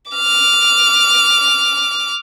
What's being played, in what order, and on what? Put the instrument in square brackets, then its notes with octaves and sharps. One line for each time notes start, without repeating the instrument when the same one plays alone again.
[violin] D6 F6